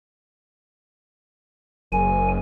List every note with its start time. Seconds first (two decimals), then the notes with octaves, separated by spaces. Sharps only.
1.92 F#1 G#5